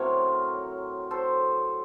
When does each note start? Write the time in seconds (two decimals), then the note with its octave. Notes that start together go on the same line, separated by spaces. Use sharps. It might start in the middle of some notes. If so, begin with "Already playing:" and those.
Already playing: A2 F#3 C4 A#4 C#5
1.11 A4 C5